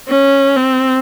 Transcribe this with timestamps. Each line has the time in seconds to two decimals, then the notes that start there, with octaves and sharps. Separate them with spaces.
0.09 C#4
0.56 C4